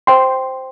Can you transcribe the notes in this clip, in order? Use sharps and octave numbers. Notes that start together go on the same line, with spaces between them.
C5 G5 C6